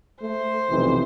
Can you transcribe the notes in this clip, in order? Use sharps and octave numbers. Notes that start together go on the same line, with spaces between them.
A3 C5
B1 F2 C3 E3